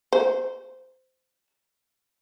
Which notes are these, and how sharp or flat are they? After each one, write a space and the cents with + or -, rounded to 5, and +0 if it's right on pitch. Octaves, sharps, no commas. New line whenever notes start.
C5 -15